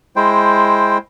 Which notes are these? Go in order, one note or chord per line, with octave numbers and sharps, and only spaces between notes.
G#3 E4 C5 G5